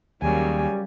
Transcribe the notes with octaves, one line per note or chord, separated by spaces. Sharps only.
D#2 C#3 F#3 G3 A#3 G#5